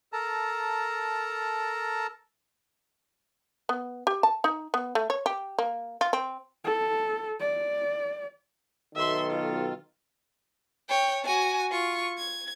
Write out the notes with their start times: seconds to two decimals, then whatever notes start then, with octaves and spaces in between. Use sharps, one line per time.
0.13 A4 A#4 A5 A#5
3.69 B3
4.07 G4
4.23 A5
4.44 D#4
4.74 B3
4.95 A3
5.10 C#5
5.26 G4
5.59 A#3
6.01 F4
6.13 C4
6.64 A4
7.40 D5
8.95 B1 D#3 A4 E5 C6
9.30 F4
10.89 C#5 G5
11.25 F#4 G#5
11.72 F4 C#6
12.18 G#6